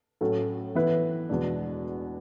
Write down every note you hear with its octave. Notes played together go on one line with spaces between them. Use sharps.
A2 F#3 A3 C#4 F#4
E3 B3 E4 B4
E2 B2 G#3 D4